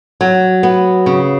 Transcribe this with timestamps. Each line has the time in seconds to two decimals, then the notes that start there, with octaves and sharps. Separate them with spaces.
0.21 F#3
0.63 B3
1.06 C#3